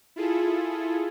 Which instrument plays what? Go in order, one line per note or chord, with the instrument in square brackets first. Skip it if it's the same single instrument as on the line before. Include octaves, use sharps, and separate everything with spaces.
[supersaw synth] E4 F4 G#4 A4